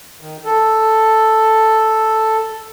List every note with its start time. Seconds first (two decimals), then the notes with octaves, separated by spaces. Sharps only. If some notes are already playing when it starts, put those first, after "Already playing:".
0.21 D#3
0.45 A4